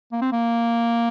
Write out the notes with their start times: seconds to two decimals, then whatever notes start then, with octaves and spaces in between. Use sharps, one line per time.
0.12 A#3
0.22 C4
0.32 A#3